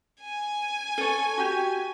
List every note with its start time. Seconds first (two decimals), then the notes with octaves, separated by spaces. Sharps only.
0.22 G#5
0.98 A4 C#5
1.38 F#4 G4